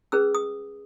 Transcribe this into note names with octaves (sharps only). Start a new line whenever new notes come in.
C#4 G#4 B4 E6
D#6